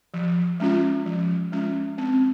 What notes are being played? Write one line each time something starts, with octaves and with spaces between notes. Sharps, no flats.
F3
G#3 C#4 F4
F3
G#3 C#4 F4
C4